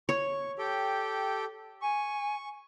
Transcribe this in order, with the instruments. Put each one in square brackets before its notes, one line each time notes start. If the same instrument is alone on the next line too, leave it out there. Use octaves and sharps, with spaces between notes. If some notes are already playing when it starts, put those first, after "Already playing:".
[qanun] C#5 [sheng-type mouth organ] C#6
[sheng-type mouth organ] G4 A4 G5
[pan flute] G#5 [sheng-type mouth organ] C#6